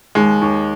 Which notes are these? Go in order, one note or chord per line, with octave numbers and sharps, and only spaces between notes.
D#2 G#3
D#2